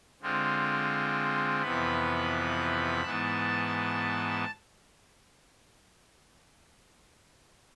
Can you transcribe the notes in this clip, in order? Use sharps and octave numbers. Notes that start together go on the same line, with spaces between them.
D3 G#3 C4 F4
F2 C3 E3 B3 B5
G#2 E3 B3 A5